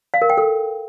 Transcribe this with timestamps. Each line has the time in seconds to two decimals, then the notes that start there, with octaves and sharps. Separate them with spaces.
0.14 F5
0.22 A#4
0.30 G5
0.38 A4